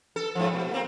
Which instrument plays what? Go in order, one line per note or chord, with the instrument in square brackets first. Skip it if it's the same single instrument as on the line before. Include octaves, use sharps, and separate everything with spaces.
[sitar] A4
G#2 F3
B2
A#3 C4